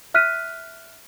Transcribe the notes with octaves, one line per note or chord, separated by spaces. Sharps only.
E5 F6 F#6 B6 D#7